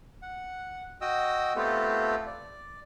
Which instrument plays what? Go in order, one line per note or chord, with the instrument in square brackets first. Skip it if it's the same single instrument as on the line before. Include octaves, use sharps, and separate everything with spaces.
[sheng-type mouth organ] F#5
F#4 D#5 G5 D#6 E6
A3 B3 C4 F4 G4 A4
D5